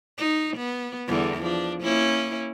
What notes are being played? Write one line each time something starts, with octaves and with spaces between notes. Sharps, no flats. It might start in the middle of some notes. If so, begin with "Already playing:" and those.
D#4
B3
E2 D3 G3
F3 D4
A#3 C#4 E4